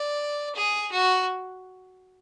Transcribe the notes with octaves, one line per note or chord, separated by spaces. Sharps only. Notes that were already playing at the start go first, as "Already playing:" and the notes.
Already playing: D5
G#4
F#4